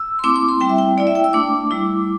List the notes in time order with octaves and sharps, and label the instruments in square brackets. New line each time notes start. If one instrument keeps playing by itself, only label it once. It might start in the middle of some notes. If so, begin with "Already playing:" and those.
Already playing: [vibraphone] E6
C6
A3 C4 E4 D6
D6
C6
G3 C4 E4 G5
E5
G5
A3 E4 D5
E5
G5
E6
A3 D4 D6
G3 E4